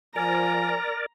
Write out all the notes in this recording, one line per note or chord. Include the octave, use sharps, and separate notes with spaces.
F3 A#4 D5 G#5 A#5